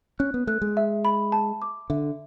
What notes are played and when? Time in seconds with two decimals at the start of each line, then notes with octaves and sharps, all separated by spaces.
0.19 C#4 F#6
0.34 B3
0.47 A3 F#6
0.62 G#3
0.77 E5
1.05 B5
1.32 A5
1.62 D6
1.90 D3 E5